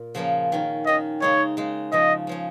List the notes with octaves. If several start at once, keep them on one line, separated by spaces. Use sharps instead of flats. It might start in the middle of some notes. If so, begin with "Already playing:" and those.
Already playing: A#2
C#3 F3 A#3 C#4
D#3 C#4
D#3 C#4 D#5
C#3 G#3 D#4 C#5
C#3 G#3 D#4
C#3 F3 C#4 D#5
C#3 F3 C#4